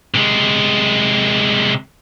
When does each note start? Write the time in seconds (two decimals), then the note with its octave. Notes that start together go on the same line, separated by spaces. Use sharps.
0.14 C3 G#3